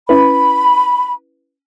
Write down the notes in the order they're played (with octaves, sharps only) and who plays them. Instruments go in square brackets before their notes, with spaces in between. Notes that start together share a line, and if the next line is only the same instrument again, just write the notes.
[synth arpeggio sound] C#4 E4 B4 [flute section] B5